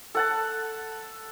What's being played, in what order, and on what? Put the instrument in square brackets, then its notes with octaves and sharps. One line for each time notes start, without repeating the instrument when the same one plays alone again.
[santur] A4 F#5 A5